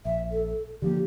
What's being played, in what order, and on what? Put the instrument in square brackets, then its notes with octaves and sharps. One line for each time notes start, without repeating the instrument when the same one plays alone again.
[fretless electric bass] A#1 [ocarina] E5
[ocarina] A4
[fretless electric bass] D3 F3 A#3 [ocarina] G4